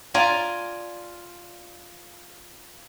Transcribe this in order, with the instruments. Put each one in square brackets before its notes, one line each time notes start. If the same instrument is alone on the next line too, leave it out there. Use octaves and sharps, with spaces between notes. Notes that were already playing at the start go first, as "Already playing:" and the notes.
[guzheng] F4 D5 G#5 A#5